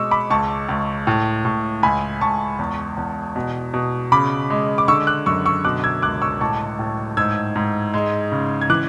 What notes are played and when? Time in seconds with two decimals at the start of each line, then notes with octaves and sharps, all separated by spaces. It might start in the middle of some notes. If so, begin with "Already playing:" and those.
Already playing: B2 G#3 C#6 D6 E6
0.11 B5 D6
0.30 C#2 A5 C#6
0.69 C#2
1.07 A2
1.45 A2
1.83 C#2 G#5 B5
2.21 C#2 A5 C#6
2.59 E2
2.97 E2
3.36 B2
3.74 B2
4.12 C#3 B5 D6
4.50 G#3
4.78 D6
4.88 D3 C#6 E6
5.07 D6 F#6
5.26 F#2 C#6 E6
5.46 C#6 E6
5.64 B2 D6 F#6
5.84 E6 G#6
6.02 C#2 D6 F#6
6.22 C#6 E6
6.41 A2 A5 C#6
6.79 A2
7.17 G#2 E6 G#6
7.56 G#2
7.94 G#3
8.32 C#3
8.61 G#6
8.70 E3 D6 F#6